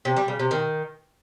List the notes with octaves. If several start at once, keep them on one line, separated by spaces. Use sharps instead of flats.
C3
G3
C#3
C3
D#3